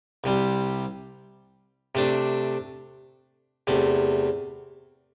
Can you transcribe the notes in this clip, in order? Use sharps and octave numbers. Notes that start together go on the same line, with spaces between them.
C2 C3 G3
C3 A3 D4
E2 C3 A3